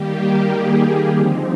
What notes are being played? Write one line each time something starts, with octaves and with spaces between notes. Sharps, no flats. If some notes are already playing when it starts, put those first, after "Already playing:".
Already playing: D#3 G3 A#3 G4
G#4
D3 F3 C4 D#4